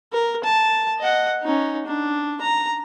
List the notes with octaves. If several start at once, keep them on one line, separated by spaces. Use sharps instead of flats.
A#4
A5
D#5 F#5
C#4 D#4
D4
A#5